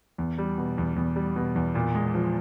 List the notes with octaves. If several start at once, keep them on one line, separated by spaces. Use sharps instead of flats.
E2
G3
B2
E2
E2
G3
B2
E2
A#2
G#3
F3